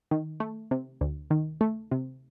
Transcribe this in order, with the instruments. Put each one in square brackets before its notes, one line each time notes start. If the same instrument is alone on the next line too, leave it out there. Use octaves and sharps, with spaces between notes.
[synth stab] D#3
A3
C3
D2
D#3
A3
C3